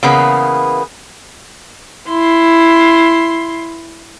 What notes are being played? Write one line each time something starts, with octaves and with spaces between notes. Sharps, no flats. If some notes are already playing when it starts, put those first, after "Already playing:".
C#3 E3 A#3 B3
E4 C6